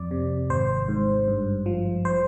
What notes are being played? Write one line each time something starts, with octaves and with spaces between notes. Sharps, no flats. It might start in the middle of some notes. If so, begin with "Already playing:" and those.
Already playing: F2 D5
C3
G#1 C5
G#2
G2
F3
C5